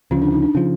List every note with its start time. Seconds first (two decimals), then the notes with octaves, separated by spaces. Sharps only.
0.11 D2 C#3 F3 C#4
0.22 D4
0.32 D#4
0.42 D4
0.55 C#3 F3